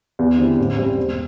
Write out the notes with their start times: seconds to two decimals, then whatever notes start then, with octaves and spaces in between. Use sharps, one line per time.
0.19 E2
0.38 D3 C4 E4 G4
0.58 A1
0.78 G2 G3 C4 G4
0.98 E1